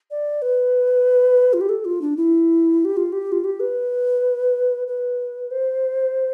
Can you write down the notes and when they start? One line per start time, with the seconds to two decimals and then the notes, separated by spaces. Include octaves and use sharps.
0.11 D5
0.42 B4
1.53 F4
1.61 G4
1.69 A4
1.85 F4
2.02 D4
2.17 E4
2.85 G4
2.97 F4
3.12 G4
3.32 F4
3.44 G4
3.60 B4
4.88 B4
5.51 C5